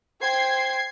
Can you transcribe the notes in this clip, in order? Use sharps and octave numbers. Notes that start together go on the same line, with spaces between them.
C5 G5 G#6 C7